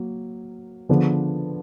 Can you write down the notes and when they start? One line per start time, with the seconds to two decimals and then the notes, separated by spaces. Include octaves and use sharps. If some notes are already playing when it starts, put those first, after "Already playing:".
Already playing: F#3 A#3
0.89 D3 F3 B3 D4 G#4